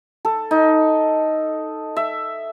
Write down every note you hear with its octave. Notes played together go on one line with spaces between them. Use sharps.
A4
D#4
E5